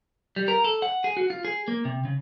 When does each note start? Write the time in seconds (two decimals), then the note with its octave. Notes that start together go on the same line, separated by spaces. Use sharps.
0.36 G3
0.48 A#4
0.64 A4
0.82 F#5
1.04 G#4
1.17 F#4
1.30 F4
1.45 G#4
1.68 A#3
1.85 C3
2.05 C#3